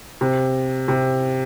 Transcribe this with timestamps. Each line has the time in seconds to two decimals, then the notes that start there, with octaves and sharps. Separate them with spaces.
0.21 C3
0.88 C3